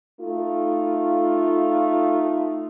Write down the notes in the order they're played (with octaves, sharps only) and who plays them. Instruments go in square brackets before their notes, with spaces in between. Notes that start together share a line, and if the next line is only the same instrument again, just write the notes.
[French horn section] A3 D#4 F4